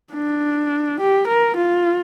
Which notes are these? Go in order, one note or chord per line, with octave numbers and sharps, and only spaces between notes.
D4
G4
A#4
F4